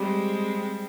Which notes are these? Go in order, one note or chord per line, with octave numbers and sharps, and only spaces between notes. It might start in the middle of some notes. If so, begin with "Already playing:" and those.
Already playing: G3 G#3 C4